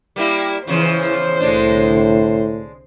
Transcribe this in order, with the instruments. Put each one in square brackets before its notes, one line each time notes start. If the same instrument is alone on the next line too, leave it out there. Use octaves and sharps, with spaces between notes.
[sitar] G3 A#3 E4
[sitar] E2 C#3 F3 [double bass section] E3 [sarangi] C5
[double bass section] C2 D3 [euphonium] A2 [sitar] G#3 D4